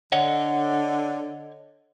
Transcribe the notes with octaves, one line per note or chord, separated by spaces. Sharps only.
D3 C#5 D#5 F#5